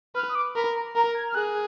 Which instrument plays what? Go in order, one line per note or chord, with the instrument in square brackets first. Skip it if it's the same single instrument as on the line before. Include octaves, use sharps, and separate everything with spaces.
[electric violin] B4 [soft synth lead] F6
[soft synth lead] D#6
D6
[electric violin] A#4 [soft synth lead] B5
[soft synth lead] A#5
[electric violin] A#4 [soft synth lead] A#5
[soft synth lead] G#6
F6
[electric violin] G#4 [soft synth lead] F#6